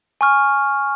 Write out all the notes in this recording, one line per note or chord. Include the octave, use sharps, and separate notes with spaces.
G#5 C#6 F6